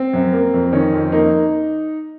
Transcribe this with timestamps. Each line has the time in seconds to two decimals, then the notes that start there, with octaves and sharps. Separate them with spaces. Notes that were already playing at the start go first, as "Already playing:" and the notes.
Already playing: C4
0.13 F#2
0.33 A#3
0.54 F2
0.72 D#3 C#4
0.93 F2
1.12 A#3 D#4